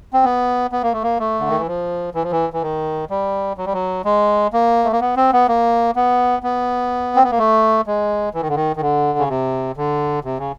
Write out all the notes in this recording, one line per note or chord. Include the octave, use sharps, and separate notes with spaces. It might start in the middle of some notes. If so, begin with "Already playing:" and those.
C4
B3
B3
A#3
A3
A#3
A3
D3
D#3
E3
F3
E3
F3
E3
E3
D#3
G3
F#3
G3
F#3
G#3
A#3
A3
A#3
B3
C4
B3
A#3
B3
B3
C4
B3
A#3
A3
G#3
E3
D#3
D3
D#3
D#3
D3
C#3
C3
D3
C3
C#3